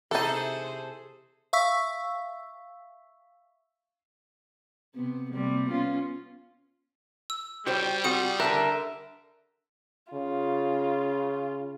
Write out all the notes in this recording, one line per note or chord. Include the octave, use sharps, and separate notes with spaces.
C3 E3 D#4 G#4 A4 C5
E5 F5 C#6 E6 B6
C3 B3
C3 G3 A#3
B3 C#4 F4
E6
G3 F#4 C5 C#5 G5
C4 F4 F#4 D5 F#5 D#6
D3 A#4 E5 A5 A#5 F#6
C#3 F4